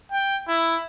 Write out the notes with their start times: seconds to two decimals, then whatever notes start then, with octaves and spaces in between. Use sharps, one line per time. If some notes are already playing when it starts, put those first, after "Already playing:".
0.11 G5
0.48 E4